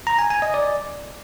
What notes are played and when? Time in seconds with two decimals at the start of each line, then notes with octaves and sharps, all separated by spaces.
0.07 A#5
0.19 G#5
0.30 G#5
0.42 D#5
0.54 D5